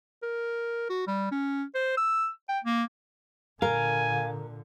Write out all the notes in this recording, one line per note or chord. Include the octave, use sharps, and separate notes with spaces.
A#4
F#4
G3
C#4
C5
E6
G5
A#3
A#2 D3 A#4 F5 G#5